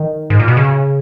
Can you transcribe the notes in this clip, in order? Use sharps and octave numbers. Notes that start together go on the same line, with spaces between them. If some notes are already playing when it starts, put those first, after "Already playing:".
Already playing: D#3
G#2
A#2
B2
C#3